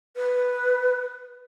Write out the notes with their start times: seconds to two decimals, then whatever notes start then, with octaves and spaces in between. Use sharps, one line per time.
0.16 B4